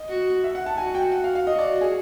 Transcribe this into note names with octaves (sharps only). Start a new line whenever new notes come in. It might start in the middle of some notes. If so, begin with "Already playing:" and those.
Already playing: D#5
F#4
E5
F#5
A5
F#4 G#5
G5
F#5
F5
F5
F#4 D#5
D5
G#4